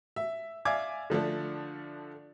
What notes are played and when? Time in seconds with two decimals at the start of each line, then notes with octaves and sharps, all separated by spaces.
0.16 E5
0.65 D5 E5 F5 G#5 D6 G#6
1.10 D3 F3 A3 D4